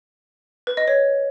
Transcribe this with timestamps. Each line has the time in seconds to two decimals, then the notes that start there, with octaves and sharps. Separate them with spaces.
0.67 B4
0.77 D#5
0.88 C#5